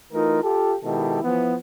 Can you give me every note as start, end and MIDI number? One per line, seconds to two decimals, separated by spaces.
0.12 0.39 52
0.12 0.39 57
0.12 0.39 63
0.12 0.39 65
0.12 0.39 70
0.43 0.74 65
0.43 0.74 67
0.43 0.74 69
0.83 1.23 47
0.83 1.23 51
0.83 1.23 56
0.83 1.23 64
0.83 1.23 67
0.83 1.23 69
1.23 1.55 52
1.23 1.55 53
1.23 1.55 59